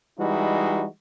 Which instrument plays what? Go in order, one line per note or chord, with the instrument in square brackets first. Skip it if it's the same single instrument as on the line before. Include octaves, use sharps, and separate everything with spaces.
[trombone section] E3 G3 G#3 D#4 E4 F#4